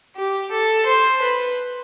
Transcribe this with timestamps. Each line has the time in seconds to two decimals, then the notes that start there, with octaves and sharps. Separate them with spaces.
0.16 G4
0.51 A4
0.86 C5
1.22 B4